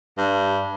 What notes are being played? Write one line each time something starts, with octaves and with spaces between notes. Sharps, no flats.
G2